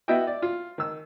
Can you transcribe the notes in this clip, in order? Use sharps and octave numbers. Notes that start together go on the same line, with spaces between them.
B3 E4 F#4 D#5 E5 G5
D5
F4
D#3 E6